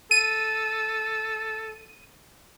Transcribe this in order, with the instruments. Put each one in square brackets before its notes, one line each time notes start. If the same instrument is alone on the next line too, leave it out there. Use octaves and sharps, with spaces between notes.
[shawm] A4 [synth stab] D#7